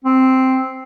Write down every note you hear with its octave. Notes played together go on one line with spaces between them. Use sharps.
C4